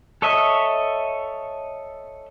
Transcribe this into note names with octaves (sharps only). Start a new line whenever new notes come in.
A4 C#5 D#5 E5